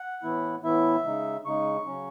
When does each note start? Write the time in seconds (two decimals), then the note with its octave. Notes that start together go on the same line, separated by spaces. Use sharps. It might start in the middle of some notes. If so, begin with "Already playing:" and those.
Already playing: F#5
0.23 A2 E3 B3 E4
0.63 A2 E3 B3 E4 E5
1.04 C#3 G#3 D#4
1.45 C#3 G#3 D#4 C#6
1.86 C#3 F#3 C#4